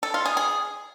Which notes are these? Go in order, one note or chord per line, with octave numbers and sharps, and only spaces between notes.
A4
F4
G#4
G#4